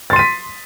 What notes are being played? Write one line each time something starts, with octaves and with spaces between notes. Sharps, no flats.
C6 A6 B6 D#7